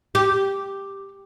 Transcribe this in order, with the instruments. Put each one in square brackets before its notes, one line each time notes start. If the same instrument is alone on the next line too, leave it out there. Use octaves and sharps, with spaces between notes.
[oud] G4